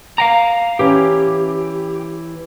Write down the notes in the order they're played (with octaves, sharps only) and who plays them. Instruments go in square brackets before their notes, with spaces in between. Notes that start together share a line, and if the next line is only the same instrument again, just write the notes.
[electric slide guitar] F5 G5 A#5
[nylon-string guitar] E3 C#4 [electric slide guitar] G4